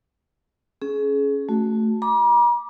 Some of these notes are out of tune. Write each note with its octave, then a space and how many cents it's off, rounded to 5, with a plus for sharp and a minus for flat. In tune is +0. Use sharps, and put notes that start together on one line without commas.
C#4 +0 G#4 +30
A3 +0 F#4 +0
A#5 +45 D6 +0